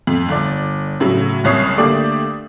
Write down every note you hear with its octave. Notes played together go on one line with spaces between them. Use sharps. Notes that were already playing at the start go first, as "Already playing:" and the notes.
F2
G1 D5
A2 C#3 F#3
F#1 C2 C#5 D#6 C7
D3 A3 A#3 G4 D5